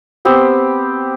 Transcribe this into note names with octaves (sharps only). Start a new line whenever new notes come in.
B3 C4 G4 C5